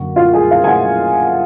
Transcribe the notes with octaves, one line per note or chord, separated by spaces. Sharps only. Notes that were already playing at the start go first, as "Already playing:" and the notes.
Already playing: F#2 D3 A#3 F#4
F4
G#4
F5
G#5
F#5